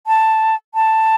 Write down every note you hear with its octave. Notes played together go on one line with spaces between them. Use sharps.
A5
A5